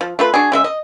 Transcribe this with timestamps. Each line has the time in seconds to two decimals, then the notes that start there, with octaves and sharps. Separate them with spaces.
0.01 F3
0.19 A3 F4 B4
0.34 D4 F#4 G#4
0.52 C#3 G#3 E5
0.64 D#5